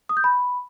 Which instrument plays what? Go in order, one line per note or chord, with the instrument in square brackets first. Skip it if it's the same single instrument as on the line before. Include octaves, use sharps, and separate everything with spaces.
[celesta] D#6
G6
B5